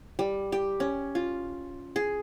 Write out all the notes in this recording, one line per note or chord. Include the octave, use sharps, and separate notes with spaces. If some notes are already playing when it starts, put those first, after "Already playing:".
G3
G4
C#4
F4
G#4